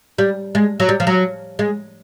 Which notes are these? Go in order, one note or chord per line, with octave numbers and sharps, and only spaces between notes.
G3
G#3
F#3
G3
F3
F#3
G#3